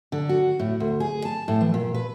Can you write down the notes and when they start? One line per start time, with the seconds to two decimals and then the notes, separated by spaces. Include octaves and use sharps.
0.12 D3
0.29 F#4
0.59 A2
0.80 D2
1.00 G#4
1.25 A5
1.48 A2
1.61 E3
1.74 A#2
1.94 B4